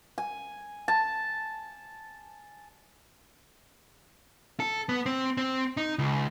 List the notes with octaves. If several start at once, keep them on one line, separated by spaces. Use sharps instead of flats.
G#5
A5
A4
B3
C4
C4
D#4
C#2